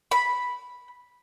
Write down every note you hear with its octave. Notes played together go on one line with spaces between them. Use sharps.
B5